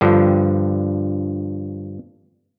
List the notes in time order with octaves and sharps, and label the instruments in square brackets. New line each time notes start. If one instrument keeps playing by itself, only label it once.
[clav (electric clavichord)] G2 D3 F3